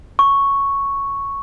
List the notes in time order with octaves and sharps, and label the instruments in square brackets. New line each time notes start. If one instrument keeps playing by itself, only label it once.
[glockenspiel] C#6